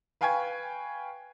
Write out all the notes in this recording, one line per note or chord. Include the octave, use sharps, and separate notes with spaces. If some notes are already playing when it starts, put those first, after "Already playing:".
B4 F5 G5 G#5 C#6 G#6